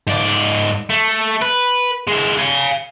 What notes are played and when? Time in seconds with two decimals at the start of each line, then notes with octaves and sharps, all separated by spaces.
0.07 G#2 D5
0.90 A3
1.41 B4
2.07 G#3 E4
2.38 F5 G#5